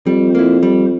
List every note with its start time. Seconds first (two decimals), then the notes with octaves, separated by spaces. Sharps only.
0.06 F2 G3
0.35 A#3 E4
0.63 G3